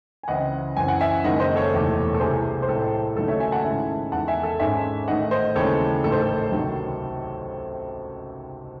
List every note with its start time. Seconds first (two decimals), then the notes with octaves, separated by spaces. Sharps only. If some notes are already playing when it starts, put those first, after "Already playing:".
0.23 G#5
0.28 C#2 C#3 E3 C4 E4 D#5 F#5
0.77 F#2 E3 C4 G#5
0.88 F#5
1.00 E5 G#5
1.24 F#1 F#2 D#3 G#3 D#5 F#5
1.40 C5 D#5
1.56 A4 C#5
1.72 E1 E2 C3 E3 A3
2.14 A4
2.20 C2 C3 E3 G#4 C5
2.62 C5
2.68 A1 A2 G#3 C4 E4 A4
3.15 D#2 C#3 F#3 A3 D#4 A4
3.28 C#5 E5
3.40 E5 G#5
3.52 F#5 A5
3.64 G#2 D#3 G#3 C#4 E4 E5 G#5
4.12 E2 D#3 G#3 F#5 A5
4.28 E5 G#5
4.43 A4
4.59 G#1 G#2 D#3 G#3 C#4 E5 G#5
5.08 A1 G#2 D#3 A3 D#5 F#5
5.31 C5 D#5
5.55 D#2 C#3 E3 G#3 C4 A4 C#5
6.03 A1 G#2 D#3 A3 D#4 A4
6.12 C5
6.22 A4
6.52 C#2 C3 D#3 F#3 C4